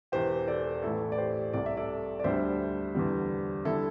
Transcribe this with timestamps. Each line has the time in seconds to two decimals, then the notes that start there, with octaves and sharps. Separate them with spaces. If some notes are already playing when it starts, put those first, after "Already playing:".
0.12 E1 E2 E3 G4 C5
0.48 A4 D5
0.83 A1 A2 E3 E4 A4
1.12 D5
1.18 G4 C5
1.53 C2 C3 G3 D5
1.66 E5
1.77 A4 D5
2.20 D5
2.24 D2 D3 G3 C5 E5
2.95 E2 D3 G3
3.65 D3 G3 E4 A4